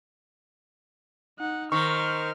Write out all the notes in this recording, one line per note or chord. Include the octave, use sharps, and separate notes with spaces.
D#4 F#5
D#3 A#4 C5 C#6 F6